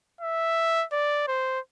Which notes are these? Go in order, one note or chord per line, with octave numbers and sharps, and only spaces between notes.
E5
D5
C5